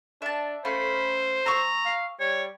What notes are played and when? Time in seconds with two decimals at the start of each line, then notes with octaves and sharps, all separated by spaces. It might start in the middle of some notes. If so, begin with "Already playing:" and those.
0.22 D4 E5 A5
0.65 A3 C#4 C5 F5 B5
1.46 A#5 C#6 E6
1.85 F5
2.20 G3 C#5